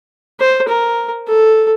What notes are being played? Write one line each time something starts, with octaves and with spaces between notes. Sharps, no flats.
C5
A#4
A4